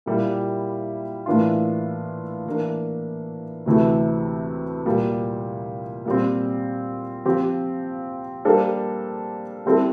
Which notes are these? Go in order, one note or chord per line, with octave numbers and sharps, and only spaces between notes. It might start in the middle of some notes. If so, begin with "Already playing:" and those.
A#2 G3 A#3 E4 G4
A2 E3 A#3 D4 F4
E3 A#3 D4
D2 C3 E3 A3
A#2 G3 A#3
A#2 G3 C4
F3 C4 G4
G3 A#3 D4 A4 C5
G3 C4 E4 A4